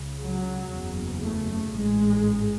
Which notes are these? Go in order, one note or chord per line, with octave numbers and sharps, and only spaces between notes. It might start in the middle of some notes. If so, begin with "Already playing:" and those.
Already playing: C#2 C#3
F#3
F#1 E2 C#3
A3
A1 G#2 G#3